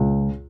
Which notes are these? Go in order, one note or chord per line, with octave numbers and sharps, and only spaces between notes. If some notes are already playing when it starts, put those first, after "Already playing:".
Already playing: C#2